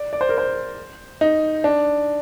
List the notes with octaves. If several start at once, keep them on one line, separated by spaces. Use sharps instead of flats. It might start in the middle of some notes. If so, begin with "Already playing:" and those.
Already playing: D5
D5
C5
A#4
C5
D#4
D4